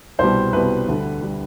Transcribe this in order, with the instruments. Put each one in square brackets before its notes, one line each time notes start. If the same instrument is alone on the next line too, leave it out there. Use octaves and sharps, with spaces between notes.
[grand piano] C2 B2 G3 C5
C2 B2 G3 B4
D2 D3 G3
D3 G3